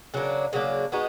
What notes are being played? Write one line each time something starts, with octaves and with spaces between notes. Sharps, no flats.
C#3 F#3 A#3 D4
C#3 F#3 A#3 D4
G#3 B3 D#4 F#4